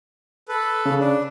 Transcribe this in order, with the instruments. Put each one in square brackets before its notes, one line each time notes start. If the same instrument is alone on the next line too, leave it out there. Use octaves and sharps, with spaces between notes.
[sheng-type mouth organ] A4 B4
[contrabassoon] C#3
[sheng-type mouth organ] D4